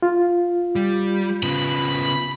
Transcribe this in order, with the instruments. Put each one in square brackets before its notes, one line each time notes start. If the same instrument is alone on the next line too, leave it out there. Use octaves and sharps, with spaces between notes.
[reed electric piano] F4
[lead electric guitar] G3
[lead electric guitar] C#3 B3 [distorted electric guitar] B5